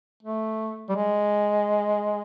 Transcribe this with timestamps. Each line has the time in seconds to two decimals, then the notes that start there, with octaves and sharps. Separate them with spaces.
0.23 A3
0.89 G3
0.96 G#3